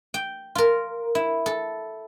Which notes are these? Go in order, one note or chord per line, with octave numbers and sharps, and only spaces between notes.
G5
F4 A#4
E4
A4